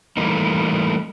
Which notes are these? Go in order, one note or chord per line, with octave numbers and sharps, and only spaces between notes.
E3 G3 A3 A#3 D#4